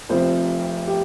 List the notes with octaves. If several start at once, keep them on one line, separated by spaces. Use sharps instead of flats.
F1 F2 C3 F3 C5
G4